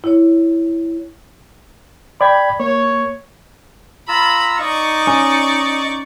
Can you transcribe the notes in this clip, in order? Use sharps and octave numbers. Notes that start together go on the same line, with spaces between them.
E4 C#5
D5 G5 B5 G#6
A#3 C#5
F4 A#5 B5 E6
D#4 D5 D#5 C#6
C#4